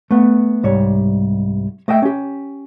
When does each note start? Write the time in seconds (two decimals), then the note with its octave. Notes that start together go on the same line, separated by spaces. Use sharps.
0.11 A3 B3
0.63 C2 G#2 G3 C#5
1.88 A3 D#5 E5 G5
2.02 C#4 G4